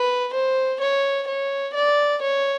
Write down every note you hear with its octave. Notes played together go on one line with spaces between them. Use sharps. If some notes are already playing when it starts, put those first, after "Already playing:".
Already playing: B4
C5
C#5
C#5
D5
C#5